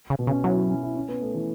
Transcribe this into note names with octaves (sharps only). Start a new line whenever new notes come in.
C#3
B2
C#3
C#4
F#3 E4
E4
C#4
E4
C#4
B3
A3
E3